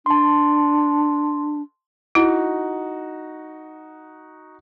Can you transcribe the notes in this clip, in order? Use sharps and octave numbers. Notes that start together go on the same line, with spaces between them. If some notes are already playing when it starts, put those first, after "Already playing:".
D4 A5 C6
D#4 E4 F#4